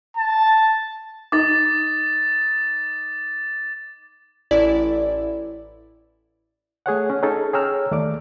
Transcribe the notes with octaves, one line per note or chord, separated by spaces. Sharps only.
A5
D#4 D6 A6
A1 E4 D5
A3 G#4 C#5 F#5
C#4
C#4 D#4 G#4 A4
G#4 C#5 G5 A#5 E6 F6
D#2 A3 D5 D6